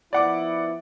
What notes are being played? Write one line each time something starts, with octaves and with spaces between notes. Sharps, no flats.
F3 B3 E4 D5 F#5 D6